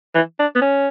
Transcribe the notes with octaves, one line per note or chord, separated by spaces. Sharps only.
E3
D4
B3
C#4